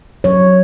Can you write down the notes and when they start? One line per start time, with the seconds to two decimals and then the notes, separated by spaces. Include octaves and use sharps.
0.24 F#3 C#5